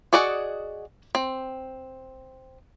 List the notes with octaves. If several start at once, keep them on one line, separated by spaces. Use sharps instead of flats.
F#4 G#4 D5 D#5 F#5
C4